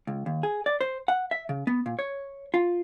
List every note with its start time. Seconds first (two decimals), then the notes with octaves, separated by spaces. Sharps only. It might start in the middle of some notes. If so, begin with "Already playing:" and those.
0.07 C#2
0.26 D#2
0.43 G#4
0.66 D5
0.81 C5
1.08 F#5
1.31 E5
1.49 C#3
1.67 B3
1.86 A#2
1.99 C#5
2.54 F4